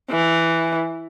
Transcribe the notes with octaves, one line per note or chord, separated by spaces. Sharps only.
E3